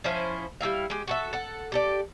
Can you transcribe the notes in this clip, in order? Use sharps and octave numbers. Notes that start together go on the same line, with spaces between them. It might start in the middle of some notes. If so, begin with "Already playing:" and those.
F3 C#4 E4 C5
G3 A#3 E4 F5
G#3 G4
F#4 A4 E5
A4 F#5
G4 A4 D5